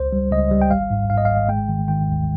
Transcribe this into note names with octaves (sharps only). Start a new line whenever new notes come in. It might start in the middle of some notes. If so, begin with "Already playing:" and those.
Already playing: C#2 C5
G3
C#2 D#5
G3
G5
G#1 F5
G#2
G#2 F5
D#5
G#1 F5
G#3 G5
D#3
D#3 G5
D#2